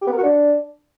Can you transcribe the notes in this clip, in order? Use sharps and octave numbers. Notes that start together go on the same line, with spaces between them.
G4
B3
A#4
F#4
D4